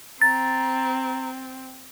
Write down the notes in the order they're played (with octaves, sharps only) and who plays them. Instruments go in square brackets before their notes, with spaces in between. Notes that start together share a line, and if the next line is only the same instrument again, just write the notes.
[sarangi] C4 [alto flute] A#5 [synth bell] A6